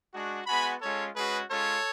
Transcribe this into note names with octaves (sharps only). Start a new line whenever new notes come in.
G#3 D4 F#4
G#3 B3 F#4 G#5 B5
G#3 C#4 F4 A4 C#5
G#3 C#4 F#4 G#4 B4
G#3 C#4 F4 A4 C#5